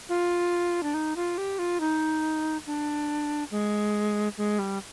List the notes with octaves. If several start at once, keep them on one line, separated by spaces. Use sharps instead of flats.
F4
D4
D#4
F4
G4
F4
D#4
D4
G#3
G#3
G3